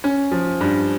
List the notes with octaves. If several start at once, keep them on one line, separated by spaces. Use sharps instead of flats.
C#4
F3
G2